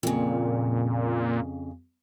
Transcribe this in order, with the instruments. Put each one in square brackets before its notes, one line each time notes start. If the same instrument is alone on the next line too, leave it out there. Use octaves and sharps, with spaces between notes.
[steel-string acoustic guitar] F2 C#3 [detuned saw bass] A#2